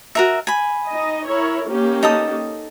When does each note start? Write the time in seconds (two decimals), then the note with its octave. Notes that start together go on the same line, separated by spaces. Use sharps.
0.15 F#4 A#4 E5
0.47 G#5 B5
0.88 D#4 D#5
1.27 E4 A#4 C#5
1.68 A#3 C#4 G4
2.03 D#4 A4 D#6